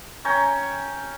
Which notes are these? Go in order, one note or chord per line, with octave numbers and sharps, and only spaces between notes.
C#4 C#5 G5 A#5